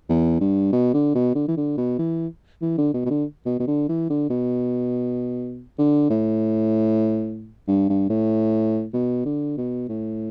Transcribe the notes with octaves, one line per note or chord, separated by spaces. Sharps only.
E2
G2
B2
D3
B2
D3
E3
D3
B2
E3
E3
D3
B2
B2
D3
B2
B2
D3
E3
D3
B2
D3
A2
G2
G2
A2
B2
D3
B2
A2